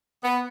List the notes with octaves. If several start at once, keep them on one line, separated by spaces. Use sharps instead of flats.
B3